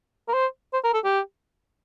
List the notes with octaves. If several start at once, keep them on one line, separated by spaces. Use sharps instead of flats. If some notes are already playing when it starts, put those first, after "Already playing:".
A#4
C5
C5
A#4
A4
G4